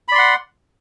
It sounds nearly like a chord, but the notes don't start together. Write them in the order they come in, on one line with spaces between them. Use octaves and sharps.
B5 D5 C6 F#5